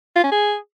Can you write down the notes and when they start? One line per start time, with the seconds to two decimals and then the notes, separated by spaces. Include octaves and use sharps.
0.16 F4
0.24 C#4
0.32 G#4